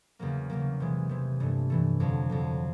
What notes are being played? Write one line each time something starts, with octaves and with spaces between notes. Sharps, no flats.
E2 C#3 F#3 A#3
E2 C#3 F#3 A#3
C3 E3 G#3
C3 E3 G#3
G2 E3 A3
G2 E3 A3
F2 D3 F#3
F2 D3 F#3